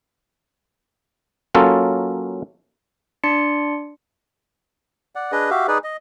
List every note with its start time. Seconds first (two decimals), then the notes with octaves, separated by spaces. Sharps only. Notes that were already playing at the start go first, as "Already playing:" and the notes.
1.55 F#3 A#3 C#4 F4 A4
3.24 D4 D5 C6 C#7
5.15 D5 F#5
5.32 D4 G#4 B4 D#5
5.50 F#4 G4 E5 F5
5.68 D#4 G#4 B4 D5
5.84 D#5